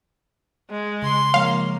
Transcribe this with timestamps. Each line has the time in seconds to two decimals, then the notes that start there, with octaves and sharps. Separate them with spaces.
0.71 G#3
1.02 C#3 C6
1.34 F3 G#3 A#3 C#5 F5